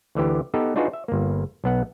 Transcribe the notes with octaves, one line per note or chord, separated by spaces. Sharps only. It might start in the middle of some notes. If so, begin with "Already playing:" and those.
D2 D3 E3 G4
B3 D#4 G4 A4 B4
D4 D#4 F4 F#4 G#4 B4
E5
G1 A#3
B1 B3 F#5